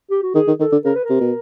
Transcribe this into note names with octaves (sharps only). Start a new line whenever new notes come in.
G4
F#4
D#3 G#4
D#3
D#3 A4
D3
C#3 A#4
B4
A#4
C3
B2